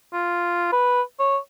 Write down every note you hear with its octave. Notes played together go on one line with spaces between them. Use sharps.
F4
B4
C#5